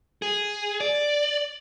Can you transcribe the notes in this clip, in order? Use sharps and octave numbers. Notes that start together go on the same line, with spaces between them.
G#4
D5